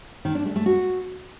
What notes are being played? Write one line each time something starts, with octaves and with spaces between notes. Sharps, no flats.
D#3
D4
A3
A3
F#4